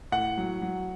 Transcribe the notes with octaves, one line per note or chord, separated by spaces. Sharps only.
A2 F#5
F#3
F#3